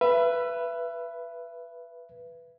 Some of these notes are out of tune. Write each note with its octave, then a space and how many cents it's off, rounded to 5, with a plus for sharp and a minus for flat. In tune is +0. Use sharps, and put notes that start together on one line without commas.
B4 +0 E5 +35